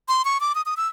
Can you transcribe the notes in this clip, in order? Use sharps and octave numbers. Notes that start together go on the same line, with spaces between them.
C6
C#6
D6
D#6
D#6
E6